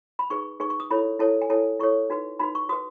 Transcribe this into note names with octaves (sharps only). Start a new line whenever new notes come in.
B5
D#4 G#4 B4 C#6
D#4 G#4 B4 C#6
C#6
D#6
E4 A4 C#5 B5
E4 A4 C#5 A5
G#5
E4 A4 C#5 A5
E4 A4 C#5 C#6
D#4 F#4 B4
D#4 F#4 B4 B5
C#6
F#4 B4 D#6